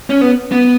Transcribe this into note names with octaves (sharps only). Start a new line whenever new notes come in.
C#4
B3
B3